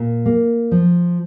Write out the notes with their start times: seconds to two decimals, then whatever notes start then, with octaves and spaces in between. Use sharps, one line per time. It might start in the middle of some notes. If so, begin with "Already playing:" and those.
Already playing: A#2
0.26 A#3
0.71 F3